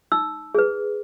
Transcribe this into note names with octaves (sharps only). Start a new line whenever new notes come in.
D#4 E6
G#4 B4